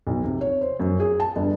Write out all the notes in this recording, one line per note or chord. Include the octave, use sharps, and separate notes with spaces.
B1
C3
C#5
C5
F#2
G#4
A5
G1